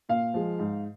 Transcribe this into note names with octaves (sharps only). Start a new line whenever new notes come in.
A#2 F5
F3 G#3
G#2